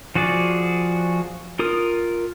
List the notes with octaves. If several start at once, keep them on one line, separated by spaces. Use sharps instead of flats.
F3 F#4 G#4 D5
F4 A#4 D#6